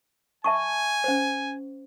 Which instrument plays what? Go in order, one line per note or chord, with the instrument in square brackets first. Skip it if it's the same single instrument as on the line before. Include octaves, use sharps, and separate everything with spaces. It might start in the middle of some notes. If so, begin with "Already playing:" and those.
[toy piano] E5 A5 C#6 [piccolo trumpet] G#5
[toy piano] C#4 C5